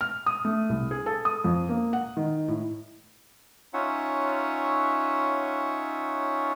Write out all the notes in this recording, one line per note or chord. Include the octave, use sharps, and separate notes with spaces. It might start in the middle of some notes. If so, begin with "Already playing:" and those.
F6
D#6
A3
C2
G#4
A4
D#6
F2
A#3
F#5
D#3
A2
C#4 D#4 F4 C#5 E5 F#5